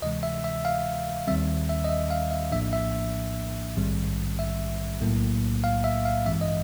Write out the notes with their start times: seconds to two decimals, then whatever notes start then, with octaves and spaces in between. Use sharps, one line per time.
0.02 D2 C3 E3 G#3 D#5
0.23 E5
0.44 E5
0.65 F5
1.27 D#2 D#3 G3 C4 E5
1.69 E5
1.84 D#5
1.89 E5
2.11 F5
2.31 E5
2.52 A#1 A2 F3 A#3 D4 E5
2.73 E5
3.77 A#1 G#2 D#3 G3 C4
4.39 E5
5.01 B1 A2 F#3 A#3
5.64 F5
5.84 E5
6.05 F5
6.25 A1 G2 E3 G#3 C4 E5
6.41 D#5